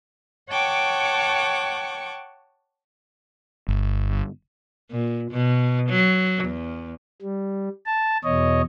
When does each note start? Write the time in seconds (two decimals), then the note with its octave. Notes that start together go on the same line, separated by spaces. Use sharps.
0.49 C#5 F#5 G5 A5 C#6 D6
3.68 G1
4.91 A#2
5.31 B2
5.90 F#3
6.44 E2
7.22 G3
7.86 A5
8.24 E2 B2 C#5 D#5